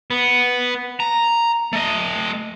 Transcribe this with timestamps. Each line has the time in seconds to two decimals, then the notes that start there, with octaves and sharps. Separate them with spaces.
0.11 B3
1.00 A#5
1.73 A3 D#5